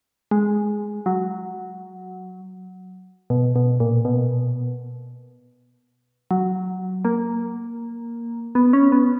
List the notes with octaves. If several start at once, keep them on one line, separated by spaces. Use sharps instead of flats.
G#3
F#3
B2
B2
A#2
B2
F#3
A#3
B3
C#4
B3